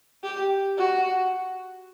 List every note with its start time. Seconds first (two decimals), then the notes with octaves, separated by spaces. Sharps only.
0.23 G4
0.77 F#4